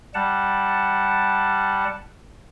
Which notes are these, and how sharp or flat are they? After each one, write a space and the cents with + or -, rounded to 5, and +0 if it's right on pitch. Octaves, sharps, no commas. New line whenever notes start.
G3 +0 F#5 +0 A5 +0